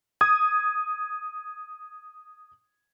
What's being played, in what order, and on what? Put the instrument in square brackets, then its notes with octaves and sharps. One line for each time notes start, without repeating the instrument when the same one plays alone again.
[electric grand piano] D#6 G#6